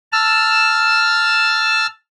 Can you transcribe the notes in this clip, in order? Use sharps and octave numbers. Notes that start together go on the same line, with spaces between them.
A5 E6 F6